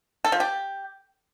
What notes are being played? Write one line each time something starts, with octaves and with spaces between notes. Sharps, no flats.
A4
F3
G4